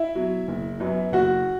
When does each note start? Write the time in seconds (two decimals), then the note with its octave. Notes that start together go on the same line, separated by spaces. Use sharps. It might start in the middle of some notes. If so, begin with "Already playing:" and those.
Already playing: E4 E5
0.15 B2 F#3
0.48 F#1
0.80 F#2 F#3 B3
1.12 F#1 F#4 F#5